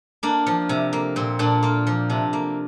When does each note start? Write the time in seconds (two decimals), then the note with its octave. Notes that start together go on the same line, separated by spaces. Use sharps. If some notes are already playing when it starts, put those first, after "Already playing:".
0.23 A#3 D4
0.47 F3
0.69 C3
0.93 A#3
1.16 A#2 C4
1.39 A#2 D4
1.63 A#3 F4
1.87 F3
2.10 C3 D4
2.33 A#3